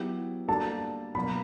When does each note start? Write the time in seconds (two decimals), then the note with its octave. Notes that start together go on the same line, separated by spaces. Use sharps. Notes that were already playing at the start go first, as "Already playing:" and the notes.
Already playing: F#3 B3 E4 G4
0.48 G3 A#3 D4 F#4 A4 A5
1.15 B2 F#3 A#3 B5